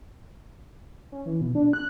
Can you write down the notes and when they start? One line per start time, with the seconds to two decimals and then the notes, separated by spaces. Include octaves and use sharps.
1.12 C#4
1.26 E3
1.41 B2
1.55 D4
1.73 F#6